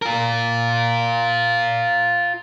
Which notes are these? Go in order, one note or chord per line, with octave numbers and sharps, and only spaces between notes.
F4 A#4